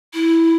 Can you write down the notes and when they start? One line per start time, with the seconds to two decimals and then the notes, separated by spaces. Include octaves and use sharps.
0.14 E4